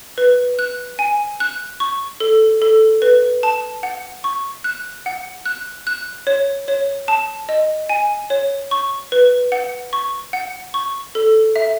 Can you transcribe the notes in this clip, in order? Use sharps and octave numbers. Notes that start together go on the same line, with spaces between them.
B4
F#6
G#5
F#6
C#6
A4
A4
B4
A5
F#5
C#6
F#6
F#5
F#6
F#6
C#5
C#5
A5
D#5
G#5
C#5
C#6
B4
F#5
C#6
F#5
C#6
A4
E5